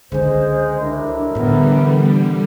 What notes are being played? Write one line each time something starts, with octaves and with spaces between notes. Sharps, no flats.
C#2 D3 G#3 C5
A1 D4 E4 A#4
A2 D3 E3 G3 B3